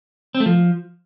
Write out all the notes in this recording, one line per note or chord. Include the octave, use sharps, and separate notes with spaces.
C4
A3
F3